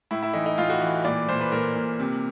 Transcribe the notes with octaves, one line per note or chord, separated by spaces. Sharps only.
A2 E4
E4
E3 D#4
D#4
A2 F4
F#4
E3
A#2 D5
A#2 C5
B4
A#2 A#4
A#2
C3